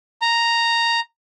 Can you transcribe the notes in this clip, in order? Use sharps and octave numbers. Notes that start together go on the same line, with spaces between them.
A#5